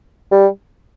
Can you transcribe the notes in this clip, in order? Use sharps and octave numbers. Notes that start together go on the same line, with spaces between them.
G3